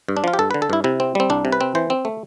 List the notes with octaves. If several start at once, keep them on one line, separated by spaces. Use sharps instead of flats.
G2
D4
F3 F4
G4
G2 A4
D3 B4
A4
G2 E4
C3 E4
C4
G3 C4
C2 D4
C3
B4
C4
E3 C5
C4
A3